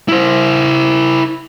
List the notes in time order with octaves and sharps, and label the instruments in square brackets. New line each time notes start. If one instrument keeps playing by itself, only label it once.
[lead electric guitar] E4 C5